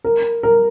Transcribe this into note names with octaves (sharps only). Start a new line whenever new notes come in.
A#4
A#4